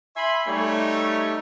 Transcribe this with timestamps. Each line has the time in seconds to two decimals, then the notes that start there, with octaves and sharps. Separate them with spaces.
0.16 E5 G#5 B5 C6
0.48 G3 A3 D#4 G4 C#5